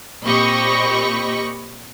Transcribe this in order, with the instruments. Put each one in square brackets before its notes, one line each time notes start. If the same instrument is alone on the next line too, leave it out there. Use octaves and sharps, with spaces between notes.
[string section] A#2 C4 G4 D#5 B5 C#6